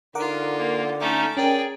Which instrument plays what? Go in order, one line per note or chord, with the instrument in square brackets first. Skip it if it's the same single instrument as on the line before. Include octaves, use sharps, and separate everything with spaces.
[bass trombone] D3 [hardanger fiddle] D#4 F4 [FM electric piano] A#4 F#5 D6
[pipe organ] A#3
[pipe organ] A3 C#4 D#4 [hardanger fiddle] A4 D6
[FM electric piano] C#4 A#4 [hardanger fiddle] G#4 [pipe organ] D5 G5